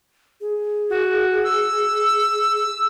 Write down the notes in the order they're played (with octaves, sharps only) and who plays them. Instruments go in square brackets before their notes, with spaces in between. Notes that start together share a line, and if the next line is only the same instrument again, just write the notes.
[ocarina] G#4
[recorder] F#4
E6